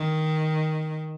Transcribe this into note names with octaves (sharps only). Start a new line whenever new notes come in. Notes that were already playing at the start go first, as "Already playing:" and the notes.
Already playing: D#3